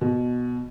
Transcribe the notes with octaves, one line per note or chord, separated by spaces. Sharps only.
B2